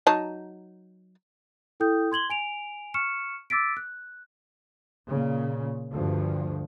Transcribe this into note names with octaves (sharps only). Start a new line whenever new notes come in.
F#3 D#4 A5
E4 A4 G5 D#6 G6
C6 G#6 F#7 G7
G#5 D7 F7
C#6 F6 C#7 E7
D6 E6 A6 B6 D7
F#6
A#2 C#3
D2 G2 F3